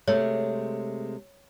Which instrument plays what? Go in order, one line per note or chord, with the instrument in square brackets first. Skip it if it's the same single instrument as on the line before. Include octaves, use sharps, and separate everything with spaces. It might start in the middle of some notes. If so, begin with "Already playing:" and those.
[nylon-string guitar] C3 G#3 A3 [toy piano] C#5